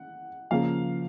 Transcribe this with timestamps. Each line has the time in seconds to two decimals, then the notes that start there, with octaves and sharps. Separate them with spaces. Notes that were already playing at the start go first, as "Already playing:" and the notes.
Already playing: F#5
0.51 C#3 F3 A#3 F5